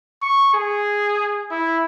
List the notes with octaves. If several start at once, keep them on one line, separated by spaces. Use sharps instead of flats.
C#6
G#4
E4